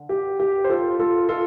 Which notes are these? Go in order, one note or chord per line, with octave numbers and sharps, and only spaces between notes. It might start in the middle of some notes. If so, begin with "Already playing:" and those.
Already playing: D3
G4
G4
C5
F4 A4
F4 A4
F4 A4